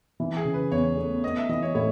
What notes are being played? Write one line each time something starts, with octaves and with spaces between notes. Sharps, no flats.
E3
G#4
C#3
B4
E2 C#5
A3
B3 D#5
E5
E3 D#5
C#5
A2 C#5